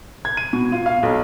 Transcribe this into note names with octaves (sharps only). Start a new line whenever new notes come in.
G#6
D#7
B2
F4
F5
B1